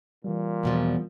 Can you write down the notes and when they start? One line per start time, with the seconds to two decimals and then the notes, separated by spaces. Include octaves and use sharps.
0.24 A#2 E3 G3
0.63 E2 B2 F3